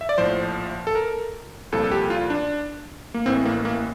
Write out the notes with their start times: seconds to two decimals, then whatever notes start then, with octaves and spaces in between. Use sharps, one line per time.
0.01 E5
0.09 D5
0.18 A#1 A2 F3 C5
0.87 A4
0.95 A#4
1.72 C2 A#2 F3 A4
1.84 A4
1.92 G4
2.10 F4
2.30 D4
3.14 A#3
3.26 A1 A2 E3 C4
3.46 A#3
3.65 A#3